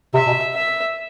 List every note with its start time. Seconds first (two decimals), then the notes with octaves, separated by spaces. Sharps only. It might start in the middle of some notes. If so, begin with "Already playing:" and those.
0.14 C3 E5
0.27 B2
0.55 E5